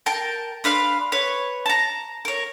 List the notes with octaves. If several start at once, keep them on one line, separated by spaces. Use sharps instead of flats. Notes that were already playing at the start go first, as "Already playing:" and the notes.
A#4 G5 A5
D4 B4 F5 C6
B4 C#5
A5 A#5
A#4 C#5